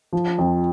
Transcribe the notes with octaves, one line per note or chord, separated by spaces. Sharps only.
F3
F2